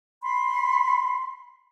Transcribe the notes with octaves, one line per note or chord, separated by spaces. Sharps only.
B5 C6